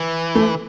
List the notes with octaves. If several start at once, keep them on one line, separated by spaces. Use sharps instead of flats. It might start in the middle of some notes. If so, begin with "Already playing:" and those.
Already playing: E3
A3